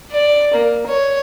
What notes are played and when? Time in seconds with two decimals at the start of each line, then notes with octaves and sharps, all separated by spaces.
0.12 D5
0.54 A#3
0.87 C#5